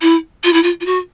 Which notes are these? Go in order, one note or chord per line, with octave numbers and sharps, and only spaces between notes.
E4
F4
E4
F4
F4
F#4